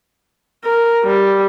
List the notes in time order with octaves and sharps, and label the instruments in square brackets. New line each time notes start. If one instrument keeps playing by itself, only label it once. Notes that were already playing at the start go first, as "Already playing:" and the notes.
[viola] A#4
G3